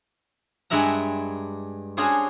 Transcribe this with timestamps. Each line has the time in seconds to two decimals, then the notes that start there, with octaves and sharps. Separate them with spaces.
0.70 G2 G#3 E5 F#5 A#5
1.97 C#4 D4 F#4 G#4 C5 C#5